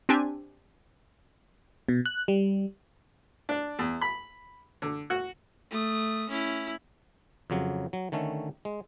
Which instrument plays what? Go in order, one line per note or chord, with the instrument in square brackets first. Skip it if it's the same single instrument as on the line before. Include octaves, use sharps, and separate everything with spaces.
[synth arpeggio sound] C4 D4 G4 G#5
[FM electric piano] B2
F#6
G3
[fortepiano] D4
E2
B5
D3
F#4
[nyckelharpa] A3 D#6
C#4 E4
[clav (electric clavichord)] F2 C#3 F#3
F#3
D3 D#3 A3 C#4
G#3